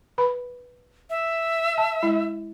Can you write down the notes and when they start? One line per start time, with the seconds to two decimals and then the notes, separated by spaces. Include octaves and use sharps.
0.18 B4 B5
1.10 E5
1.78 A5
2.03 G#3 E4